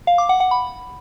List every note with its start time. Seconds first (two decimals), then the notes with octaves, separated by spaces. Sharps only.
0.07 F5
0.18 D6
0.29 F#5
0.40 F#5
0.51 B5